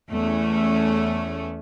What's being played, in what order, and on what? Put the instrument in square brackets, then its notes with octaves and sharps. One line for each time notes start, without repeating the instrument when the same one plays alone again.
[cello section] E2 A3 C#4